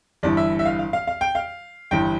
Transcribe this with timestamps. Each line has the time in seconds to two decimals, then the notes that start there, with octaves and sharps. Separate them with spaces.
0.23 G1 G2 E3 D5
0.37 E5
0.59 E5
0.65 F5
0.79 F5
0.93 F5
1.07 F5
1.21 G5
1.35 F5
1.91 G1 G2 E3 G5